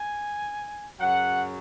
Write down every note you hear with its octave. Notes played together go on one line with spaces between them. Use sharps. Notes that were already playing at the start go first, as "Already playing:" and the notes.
Already playing: G#5
F#2 C#3 F#3 F#5